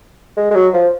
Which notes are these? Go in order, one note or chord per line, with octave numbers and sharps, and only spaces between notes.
G#3
G#3
F#3
F3